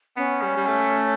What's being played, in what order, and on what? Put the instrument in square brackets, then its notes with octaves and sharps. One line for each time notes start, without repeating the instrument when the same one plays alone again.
[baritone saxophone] B3 [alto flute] C#4
[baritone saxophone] G3
G3
A3